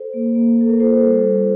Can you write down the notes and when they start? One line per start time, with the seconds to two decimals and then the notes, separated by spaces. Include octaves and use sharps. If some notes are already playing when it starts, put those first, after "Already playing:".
Already playing: A4 C5
0.14 A#3
0.35 A#3
0.58 A#3 A4
0.69 A#4
0.80 F4 A4 C5
1.01 G3
1.23 G3